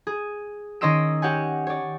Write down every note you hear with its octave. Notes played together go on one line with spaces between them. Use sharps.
G#4
D#3 C#4 D#5 C6 E6 D7
G4 C#5 F#5 G#5
C#5 D5